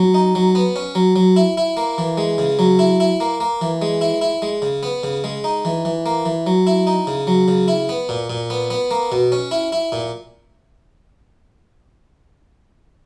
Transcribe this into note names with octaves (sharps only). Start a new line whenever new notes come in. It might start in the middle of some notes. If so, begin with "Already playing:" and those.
Already playing: F#3
D#4
F#3
B3
C#4
F#3
F#3
E4
E4
A#3
E3
G#3
C#3
F#3
E4
E4
A#3
A#3
E3
G#3
E4
E4
G#3
C#3
B3
C#3
G#3
D#4
E3
E3
A#3
E3
F#3
E4
D#4
C#3
F#3
C#3
E4
B3
A#2
A#2
B3
B3
A#3
B2
C#4
E4
E4
A#2